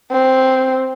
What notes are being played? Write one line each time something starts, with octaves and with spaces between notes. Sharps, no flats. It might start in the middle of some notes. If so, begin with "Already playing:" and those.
C4